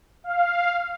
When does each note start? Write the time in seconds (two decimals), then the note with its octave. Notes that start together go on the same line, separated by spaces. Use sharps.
0.24 F5